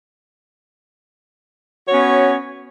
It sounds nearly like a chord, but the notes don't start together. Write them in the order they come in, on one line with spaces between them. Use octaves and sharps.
C#5 F#4 C#4 B3